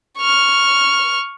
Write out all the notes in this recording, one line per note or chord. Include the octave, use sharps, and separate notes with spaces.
C#6 F6